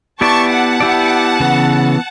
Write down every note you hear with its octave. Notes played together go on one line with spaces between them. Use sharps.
B3 E4 G4 D5 A5 C#6
F#5 A5
B3 E4 G4 D5
C#3 E3 B3